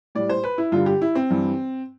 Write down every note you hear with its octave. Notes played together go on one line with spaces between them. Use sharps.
A2 G3 D5
C5
B4
E4
G2 D3 G3 F4
G4
E4
C4
G2 E3 G3